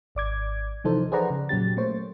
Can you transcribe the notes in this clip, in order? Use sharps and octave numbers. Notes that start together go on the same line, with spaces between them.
G#1 D5 D6 G#6
C3 E3 F3 D#4 A4 C5
G#4 B4 C5 D5 F#5 A#5
C#3
A#2 F#3 C#4 G4 A6
A3 A#3 C5 C#5